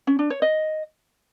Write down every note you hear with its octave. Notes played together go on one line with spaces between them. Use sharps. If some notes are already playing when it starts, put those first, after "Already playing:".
C#4
D4
C#5
D#5